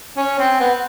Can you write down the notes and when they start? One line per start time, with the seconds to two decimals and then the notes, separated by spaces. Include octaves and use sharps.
0.17 C#4
0.39 C4
0.60 B3